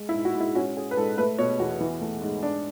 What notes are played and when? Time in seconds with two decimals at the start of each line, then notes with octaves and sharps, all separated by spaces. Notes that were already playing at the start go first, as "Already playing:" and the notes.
Already playing: G#3
0.09 E4
0.14 G#2
0.25 F#4
0.35 G#2
0.40 E4
0.55 C#4 F#4
0.77 C#4 G#4
0.91 B4
0.97 G#2 A4
1.18 A3 B4
1.39 B2 C#5
1.59 E2 F#4
1.81 E3
2.01 A3
2.22 G#2
2.43 D4